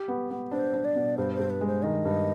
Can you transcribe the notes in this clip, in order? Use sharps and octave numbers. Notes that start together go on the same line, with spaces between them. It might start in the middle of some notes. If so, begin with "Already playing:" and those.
Already playing: G4
B3
B3
D4 C5
D4
D5
B2
G2 C5
C5
G2
B4
G#3
C5
D#3 D#5
G2